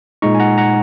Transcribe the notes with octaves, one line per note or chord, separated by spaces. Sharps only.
A#2 G#3 D#4 A#5 C#6
G#5
F#5 A#5
F#5 A#5